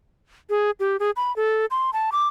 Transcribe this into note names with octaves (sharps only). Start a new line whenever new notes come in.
G#4
G4
G#4
B5
A4
C6
A5
D6